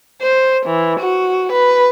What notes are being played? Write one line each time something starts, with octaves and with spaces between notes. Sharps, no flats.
C5
E3
F#4
B4